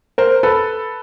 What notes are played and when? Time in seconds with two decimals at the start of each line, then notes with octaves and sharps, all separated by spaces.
0.18 A#4 C5
0.43 A4 B4